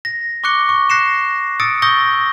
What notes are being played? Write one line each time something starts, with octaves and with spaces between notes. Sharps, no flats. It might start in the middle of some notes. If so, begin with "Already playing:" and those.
A#6
C#6 D6 F#6 C#7 G7
C#6
F#6 A#6 C7 C#7 E7
D#6 E6 A6 C#7 D7
C#6 D#6 E6 G6 A#6 G7